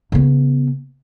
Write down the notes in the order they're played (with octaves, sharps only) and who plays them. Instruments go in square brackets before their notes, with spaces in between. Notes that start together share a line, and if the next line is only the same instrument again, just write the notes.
[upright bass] C#3 B3